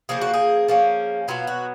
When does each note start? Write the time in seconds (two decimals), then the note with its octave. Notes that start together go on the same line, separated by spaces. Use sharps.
0.09 C#3 F3 A#3 G#4
0.21 F#4
0.34 G#4
0.68 F3 A#3 C#4
1.28 B2 F#3 B3 F4
1.47 F#4